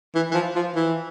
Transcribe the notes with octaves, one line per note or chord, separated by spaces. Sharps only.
E3
E3
F3
F3
E3